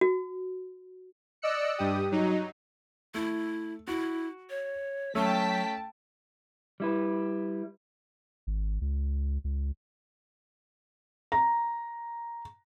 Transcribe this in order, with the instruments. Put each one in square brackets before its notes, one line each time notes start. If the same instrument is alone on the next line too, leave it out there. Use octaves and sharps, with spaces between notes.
[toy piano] F#4
[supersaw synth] D5 D#5 E6 F#6 C#7
G2 G4 D#6
F#3 D#4
[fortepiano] A3 [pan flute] E4
[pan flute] E4 [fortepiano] F#4
[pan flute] C#5
[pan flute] F#3 [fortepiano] A3 C#4 [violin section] G5 A5 B6
[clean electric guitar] G3 E4 B4
[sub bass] G#1
C#2
C#2
[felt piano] A#5